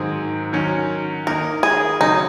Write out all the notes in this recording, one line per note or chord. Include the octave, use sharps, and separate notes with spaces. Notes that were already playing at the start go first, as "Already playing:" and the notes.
Already playing: G#2 D#3 F#3 C4 G#4
D#3 F#3 C#4
D#3 A#3 D#4 A#4
G#4
C#3 F#3 C4 D#4